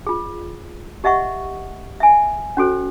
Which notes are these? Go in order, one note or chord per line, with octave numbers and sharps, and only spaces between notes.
F4 G#4
G4 D#5 E5 F#5 C#6
E5 G#5
C#4 F#4 A4 C5